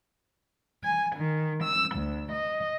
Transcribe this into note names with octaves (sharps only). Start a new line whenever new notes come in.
G#5
D#3
E6
D2
D#5